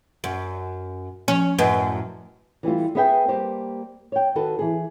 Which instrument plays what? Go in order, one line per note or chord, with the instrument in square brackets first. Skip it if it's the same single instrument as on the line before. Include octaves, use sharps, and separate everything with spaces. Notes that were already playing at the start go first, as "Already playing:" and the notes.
[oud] F#2
[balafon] F3 [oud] C#4
[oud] F#2 A2 [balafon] B4 D#5
[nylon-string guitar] E3 G3 A3 F4
B3 G#4 B4 E5 F#5 G5
G3 A#3 G4 C5
C#5 G5
D#3 F#4 A4 B4 A5
E3 G#4